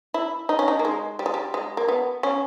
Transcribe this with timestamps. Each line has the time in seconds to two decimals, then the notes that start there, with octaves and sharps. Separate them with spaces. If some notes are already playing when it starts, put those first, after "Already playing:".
0.14 E4
0.49 D#4
0.59 C#4
0.68 D#4
0.79 A#3
0.85 G#3
1.19 G3
1.26 G#3
1.34 G3
1.54 G#3
1.77 A#3
1.88 B3
2.23 C#4